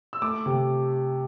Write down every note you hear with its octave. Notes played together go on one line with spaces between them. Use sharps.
E6
A3 D6
C3